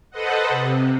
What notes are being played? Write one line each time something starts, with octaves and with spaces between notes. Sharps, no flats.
A4 B4 C5 D#5 F#5
C3